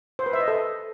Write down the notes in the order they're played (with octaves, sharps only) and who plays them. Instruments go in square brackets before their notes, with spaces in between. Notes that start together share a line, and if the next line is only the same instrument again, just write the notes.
[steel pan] C5
B4
E5
D#5
A4